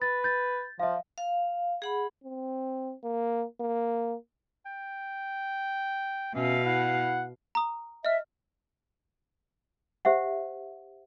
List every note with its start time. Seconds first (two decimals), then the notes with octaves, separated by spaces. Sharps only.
0.02 B4 A6
0.24 G6 A6
0.80 F3 E5 F5
1.18 F5
1.82 G#4 F#5 B5
2.24 C4
3.04 A#3
3.60 A#3
4.66 G5
6.35 B2 C#4 E5 F5
6.65 E4 F#5
7.55 A#5 D#6
8.05 D#5 E5 F6
10.05 G4 C5 E5 F#5